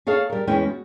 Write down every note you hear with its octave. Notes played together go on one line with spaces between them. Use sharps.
G#4 A4 C#5 F5
G3 A#4
E2 G#3 C#4 E4 B4 G5
F#4